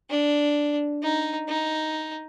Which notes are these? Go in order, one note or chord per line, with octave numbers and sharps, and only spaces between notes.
D4
D#4
D#4